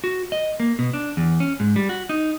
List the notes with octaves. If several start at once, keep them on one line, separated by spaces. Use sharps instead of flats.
F#4
D#5
A#3
B2
D4
E2
C#4
G#2
G3
F#4
D#4